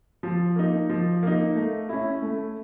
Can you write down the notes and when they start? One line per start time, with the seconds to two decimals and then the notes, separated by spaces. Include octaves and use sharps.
0.23 F3
0.56 A#3 D#4
0.89 F3
1.23 A#3 D#4
1.56 A3
1.89 C#4 E4
2.22 A3